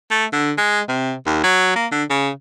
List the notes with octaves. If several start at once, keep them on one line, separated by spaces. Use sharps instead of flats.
A3
D3
G#3
C3
D#2
F#3
A#3
D3
C#3